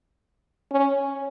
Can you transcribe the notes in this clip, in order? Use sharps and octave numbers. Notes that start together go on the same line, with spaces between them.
C#4